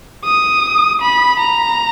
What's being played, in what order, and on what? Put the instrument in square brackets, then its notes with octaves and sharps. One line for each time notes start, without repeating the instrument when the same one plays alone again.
[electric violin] D#6
B5
A#5